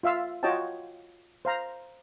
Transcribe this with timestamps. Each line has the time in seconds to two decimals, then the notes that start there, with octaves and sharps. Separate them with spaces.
0.03 F4 E5 F5 E6
0.43 F4 F#4 C#5 D#5 G5 A5
1.45 C5 F5 A#5